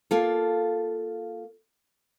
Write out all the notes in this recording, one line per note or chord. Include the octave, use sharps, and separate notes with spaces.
A#3 F4 A4